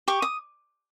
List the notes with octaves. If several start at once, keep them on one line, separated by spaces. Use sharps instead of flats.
G4 C#6
D#6